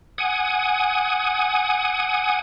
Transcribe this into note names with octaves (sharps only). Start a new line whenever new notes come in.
F#5 G#5 D#6